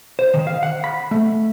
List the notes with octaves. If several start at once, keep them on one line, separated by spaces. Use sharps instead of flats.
C5
D#3
F5
F#5
B5
A3